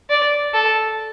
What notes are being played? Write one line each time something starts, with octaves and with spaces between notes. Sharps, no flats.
D5
A4